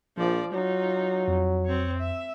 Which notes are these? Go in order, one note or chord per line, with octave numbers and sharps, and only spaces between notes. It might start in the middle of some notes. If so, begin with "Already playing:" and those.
A#1 F3 D5
F#3 D#4 F4
F2
C4 C#5
E5